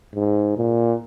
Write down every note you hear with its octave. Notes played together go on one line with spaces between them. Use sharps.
G#2
A#2